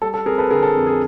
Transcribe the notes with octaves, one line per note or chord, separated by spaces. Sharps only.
G3 A4
A4
C4 G#4 A#4
A4 B4
D3 G#4 A#4
A4
F2
G#4